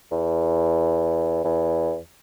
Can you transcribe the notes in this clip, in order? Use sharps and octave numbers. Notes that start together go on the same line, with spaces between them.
E2
E2